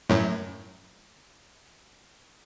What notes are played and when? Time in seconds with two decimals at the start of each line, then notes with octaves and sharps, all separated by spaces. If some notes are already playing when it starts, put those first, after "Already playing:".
0.09 F#2 A2